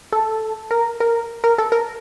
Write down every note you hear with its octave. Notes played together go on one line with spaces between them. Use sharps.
A4
A#4
A#4
A#4
A4
A#4